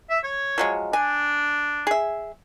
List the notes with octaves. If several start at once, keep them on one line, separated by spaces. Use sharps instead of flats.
E5
C#5
F3 F#3 G#3
D4 G#5
G#4 E5